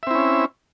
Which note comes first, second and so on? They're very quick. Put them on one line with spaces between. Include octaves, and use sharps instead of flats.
E5 C4 E4 C#4